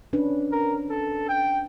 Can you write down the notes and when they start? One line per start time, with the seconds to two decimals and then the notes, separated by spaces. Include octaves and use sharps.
0.13 C#4 D4 B4
0.52 A#4
0.90 A4
1.29 G5